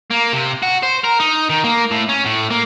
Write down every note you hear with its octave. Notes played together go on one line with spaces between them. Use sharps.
A#3
C3
F#4
C5
A#4
D#4
D#3
A#3
A2
C#4
A2
A#3